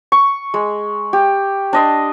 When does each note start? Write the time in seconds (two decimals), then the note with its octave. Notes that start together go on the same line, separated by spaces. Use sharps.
0.12 C#6
0.54 G#3
1.13 G4
1.73 D4 D#5 C6